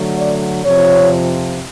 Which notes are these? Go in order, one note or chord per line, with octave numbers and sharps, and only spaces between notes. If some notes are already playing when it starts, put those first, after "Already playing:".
Already playing: D3 F#3 A3
D5
F2 C3 F3 C#5